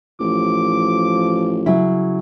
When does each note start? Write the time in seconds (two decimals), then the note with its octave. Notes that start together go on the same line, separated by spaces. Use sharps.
0.20 A1 F3 D6
1.66 C#3 F#3 E4